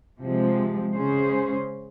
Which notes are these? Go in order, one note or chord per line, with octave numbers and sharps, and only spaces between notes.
C3 F3 G#3
C#3 G#3 C#4 G#4 C5